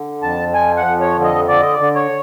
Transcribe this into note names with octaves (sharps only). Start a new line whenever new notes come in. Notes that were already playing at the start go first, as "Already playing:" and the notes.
Already playing: D3
F2 A5
F3 G#5
F#5
F2
C#5
D3
D#5
D3 D5
D#5
D5
D3
C#5